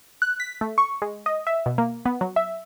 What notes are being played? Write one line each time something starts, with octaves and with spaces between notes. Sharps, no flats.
F#6
B6
A3
C#6
G#3
D#5
E5
B2
A#3
B3
F#3
E5